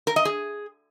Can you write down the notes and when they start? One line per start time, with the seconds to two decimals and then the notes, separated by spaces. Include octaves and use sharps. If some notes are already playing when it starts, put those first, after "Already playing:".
0.07 A#4
0.16 D#5
0.25 G#4